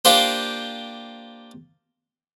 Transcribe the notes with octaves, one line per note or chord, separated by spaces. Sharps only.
A#3 D4 F4 G4 C5